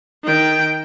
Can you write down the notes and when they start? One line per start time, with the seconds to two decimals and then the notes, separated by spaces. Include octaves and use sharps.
0.24 D#3 G5